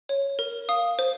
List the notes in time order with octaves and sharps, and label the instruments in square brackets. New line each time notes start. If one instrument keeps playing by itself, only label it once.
[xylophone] C#5
A#4
F5 D#6
C5